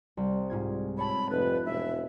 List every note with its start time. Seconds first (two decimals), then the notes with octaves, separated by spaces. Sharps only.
0.17 C2
0.50 G#2 F4 G#6
0.99 C#5 A5 B5
1.30 F1 A4 B4
1.66 E1 E5